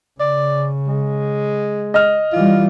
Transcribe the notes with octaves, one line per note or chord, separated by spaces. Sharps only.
C#3 D5
G#3
D#5 F6
E3 G3 F4